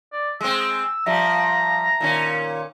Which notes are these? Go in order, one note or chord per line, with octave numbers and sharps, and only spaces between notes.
D5
G#3 C4 E6
F3 G3 E5 A5 A#5
A#2 D#3 C#4